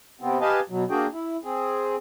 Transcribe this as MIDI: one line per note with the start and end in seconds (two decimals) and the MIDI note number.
0.21 0.38 48
0.21 0.38 59
0.21 0.38 60
0.41 0.60 67
0.41 0.60 71
0.41 0.60 75
0.41 0.60 77
0.41 0.60 80
0.41 0.60 81
0.70 0.84 47
0.70 0.84 54
0.90 1.07 58
0.90 1.07 62
0.90 1.07 66
0.90 1.07 68
0.90 1.07 79
1.13 1.37 64
1.44 1.96 60
1.44 1.96 68